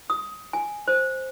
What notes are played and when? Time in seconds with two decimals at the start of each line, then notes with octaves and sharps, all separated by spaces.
0.10 D#6
0.53 G#5
0.88 C5